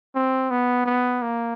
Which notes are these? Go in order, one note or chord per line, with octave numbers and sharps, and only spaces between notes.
C4
B3
B3
A#3